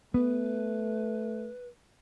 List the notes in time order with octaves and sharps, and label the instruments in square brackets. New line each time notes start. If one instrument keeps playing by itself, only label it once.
[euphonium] A3 [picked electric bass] B3 [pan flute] B4